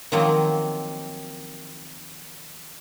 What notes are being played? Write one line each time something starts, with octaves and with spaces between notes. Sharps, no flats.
D#3 F3 F#3 A#3 C4